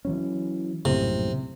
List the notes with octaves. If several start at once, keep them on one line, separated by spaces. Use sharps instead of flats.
E3 F#3 C#4
A#1 F#2 A2 C3